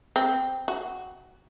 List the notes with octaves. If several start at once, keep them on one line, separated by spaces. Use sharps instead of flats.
C4
F#4